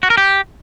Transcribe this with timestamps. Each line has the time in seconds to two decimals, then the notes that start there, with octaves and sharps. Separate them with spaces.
0.03 F#4
0.10 A#4
0.17 G4